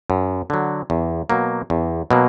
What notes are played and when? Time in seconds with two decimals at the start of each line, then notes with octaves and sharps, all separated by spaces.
0.10 F#2
0.50 D3 F#3
0.90 E2
1.30 B2 F#3 A#3
1.70 E2
2.11 B2 F#3 A#3